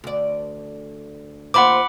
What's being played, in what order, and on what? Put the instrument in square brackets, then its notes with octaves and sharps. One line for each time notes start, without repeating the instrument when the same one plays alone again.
[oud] D2 D5
[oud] D#2 F4 C5 [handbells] F#5 B5 D6